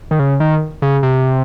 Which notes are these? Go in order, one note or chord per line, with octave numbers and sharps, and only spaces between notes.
D#3
C#3
D#3
C#3
C3